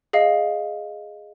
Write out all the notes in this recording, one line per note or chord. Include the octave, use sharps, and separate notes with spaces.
G#4 D#5 F5